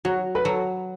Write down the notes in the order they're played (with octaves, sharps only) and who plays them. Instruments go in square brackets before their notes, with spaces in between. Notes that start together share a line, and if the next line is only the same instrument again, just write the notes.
[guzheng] F#3 [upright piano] F#4
[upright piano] B4
[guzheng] F#3 [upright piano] A4